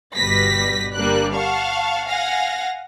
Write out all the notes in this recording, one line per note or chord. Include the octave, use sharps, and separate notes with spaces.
G1 B2 G3 B4 A#6 B6
G1 G3 A#3 D4 D5 F#6
F5 F#5 A5 C#6
F5 F#5 G#5 A#6